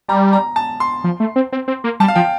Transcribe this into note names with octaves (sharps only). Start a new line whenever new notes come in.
G3 A#5
A#5
A5
C6
F3
A3
C4
C4
C4
A#3
G3 A5
F5
F3 G5